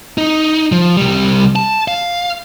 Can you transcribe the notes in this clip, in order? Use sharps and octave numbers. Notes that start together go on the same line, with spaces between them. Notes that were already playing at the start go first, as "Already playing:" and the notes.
D#4
F3
C2 G3
A5
F5